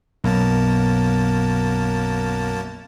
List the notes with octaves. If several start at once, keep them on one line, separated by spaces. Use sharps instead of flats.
B1 F#2 A#3 A5